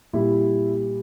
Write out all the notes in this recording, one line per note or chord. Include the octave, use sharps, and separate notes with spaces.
A#2 G3 E4